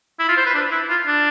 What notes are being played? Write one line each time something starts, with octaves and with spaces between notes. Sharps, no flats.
E4
F4
C5
B4
D4
E4
F4
D4